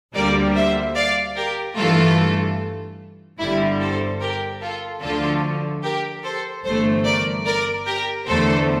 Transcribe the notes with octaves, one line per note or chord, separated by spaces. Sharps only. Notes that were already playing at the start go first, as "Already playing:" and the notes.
D2 D3 G3 A#3 A#4 D5
C5 E5
D5 F5
G4 A#4
G2 E3 A3 F4 A4
G1 G2 D3 G3 E4
A4 C5
G4 A#4
F4 A4
D2 D3 F3 A3 F4 A4
G4 A#4
A4 C5
G1 G2 E3 A3 A4 C5
A#4 D5
A#4 D5
G4 A#4
E2 D3 A3 A4 C5